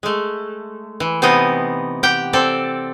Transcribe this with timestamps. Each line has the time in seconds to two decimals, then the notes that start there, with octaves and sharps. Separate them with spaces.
0.03 G#3 A3
1.00 E3
1.22 C3 E3 B3 D#4 D#5
2.03 G4 F#5 G5
2.33 C4 A4 D5